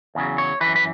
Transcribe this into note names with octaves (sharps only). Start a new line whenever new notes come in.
E2 C#3 F#3
C#5
E3 B4
F#2
B4